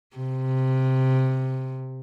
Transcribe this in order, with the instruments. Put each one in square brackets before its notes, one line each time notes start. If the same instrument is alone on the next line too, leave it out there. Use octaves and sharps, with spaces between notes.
[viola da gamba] C3